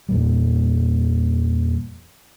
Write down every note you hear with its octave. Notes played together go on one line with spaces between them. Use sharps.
E2 A#2 G3